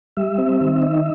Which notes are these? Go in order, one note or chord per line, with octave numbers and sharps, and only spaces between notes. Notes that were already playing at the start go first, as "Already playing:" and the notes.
G3 E5
C4
D#3
D#4